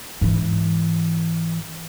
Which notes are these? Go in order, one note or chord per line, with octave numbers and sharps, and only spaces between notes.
G#2 E3